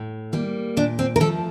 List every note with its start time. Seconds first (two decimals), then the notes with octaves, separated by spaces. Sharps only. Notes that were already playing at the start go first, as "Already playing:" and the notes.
Already playing: A2
0.33 G3 A#3
0.77 A#2 D4
0.99 C4
1.16 A#4
1.20 F3 A3 A4